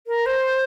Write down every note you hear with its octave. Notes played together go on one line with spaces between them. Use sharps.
A#4
C5